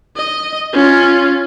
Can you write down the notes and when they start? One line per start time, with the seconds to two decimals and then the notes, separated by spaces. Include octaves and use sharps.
0.16 D#5
0.73 C#4 F4